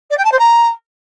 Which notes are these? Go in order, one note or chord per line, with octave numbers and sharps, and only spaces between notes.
D5
G5
A5
C5
A#5